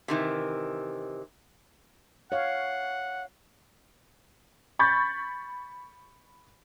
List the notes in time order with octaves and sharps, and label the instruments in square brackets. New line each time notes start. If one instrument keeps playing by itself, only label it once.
[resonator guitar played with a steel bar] C3 D#3 E3
[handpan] C#5 F5 [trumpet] F#5
[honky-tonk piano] B5 C#6 G6 A6